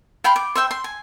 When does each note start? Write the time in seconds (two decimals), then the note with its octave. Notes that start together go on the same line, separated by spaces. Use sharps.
0.24 F5 G5 B5 C6
0.36 D6
0.55 C5 E5 G5
0.71 C6
0.84 G#5